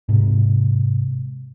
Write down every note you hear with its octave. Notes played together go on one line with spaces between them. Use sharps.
G#2 C3